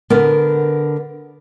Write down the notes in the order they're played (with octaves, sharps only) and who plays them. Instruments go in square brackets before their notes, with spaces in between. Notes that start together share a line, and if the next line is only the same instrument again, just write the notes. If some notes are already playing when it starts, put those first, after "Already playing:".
[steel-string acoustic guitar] D3 B3 A#4 B4